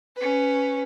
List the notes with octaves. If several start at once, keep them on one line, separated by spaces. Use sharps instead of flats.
C#4 B4